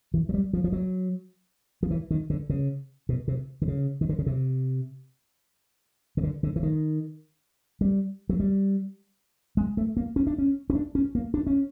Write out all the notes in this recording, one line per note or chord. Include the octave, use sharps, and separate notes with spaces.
E3
F#3
G3
F3
F3
F#3
F3
E3
D#3
D3
C#3
B2
C3
D3
C#3
D#3
D3
C#3
C3
C#3
D3
D3
E3
D#3
G3
F#3
G3
G#3
A3
A#3
C#4
D4
C#4
C#4
D4
C#4
A#3
D4
C#4